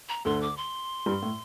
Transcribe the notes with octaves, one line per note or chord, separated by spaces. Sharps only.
A#5
D2 D3 C6
D6
C6
G2 G3
A2